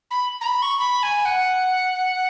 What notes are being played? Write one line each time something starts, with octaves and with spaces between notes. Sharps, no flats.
B5
A#5
B5
C#6
B5
G#5
F#5